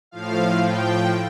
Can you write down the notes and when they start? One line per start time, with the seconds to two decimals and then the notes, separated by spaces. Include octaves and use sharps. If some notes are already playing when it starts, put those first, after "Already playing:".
0.11 A2 F3 F5
0.62 G5